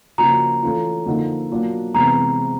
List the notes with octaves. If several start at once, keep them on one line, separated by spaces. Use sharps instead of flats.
C#3 F3 A#3 D4 F#4 A#5
E3 A3 C#4 F4
D3 F3 A#3 D#4
B2 F#3 A#3 D4 F4
C3 E3 G#3 B3 A#5